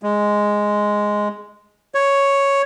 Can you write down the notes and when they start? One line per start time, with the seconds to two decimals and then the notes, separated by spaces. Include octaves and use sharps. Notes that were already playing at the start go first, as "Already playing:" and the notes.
0.03 G#3
1.95 C#5